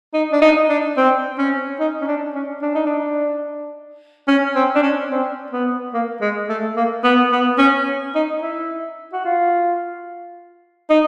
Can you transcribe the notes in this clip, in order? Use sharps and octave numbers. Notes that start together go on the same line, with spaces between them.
D#4
D4
D#4
D4
C4
C#4
D#4
C#4
D4
C#4
D4
D#4
D4
C#4
C4
D4
C#4
C4
B3
A#3
G#3
A3
A#3
B3
B3
C#4
D#4
E4
F#4
F4
D#4